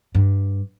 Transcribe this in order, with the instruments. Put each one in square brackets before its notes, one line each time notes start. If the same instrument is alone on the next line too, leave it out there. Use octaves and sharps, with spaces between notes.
[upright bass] G2